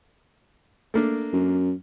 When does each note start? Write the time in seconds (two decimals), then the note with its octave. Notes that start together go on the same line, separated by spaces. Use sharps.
0.94 A3 A#3 D4
1.33 F#2